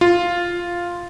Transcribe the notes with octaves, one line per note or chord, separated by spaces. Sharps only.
F4